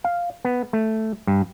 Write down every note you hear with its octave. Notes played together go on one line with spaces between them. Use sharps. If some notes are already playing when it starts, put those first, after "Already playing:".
F5
B3
A3
G2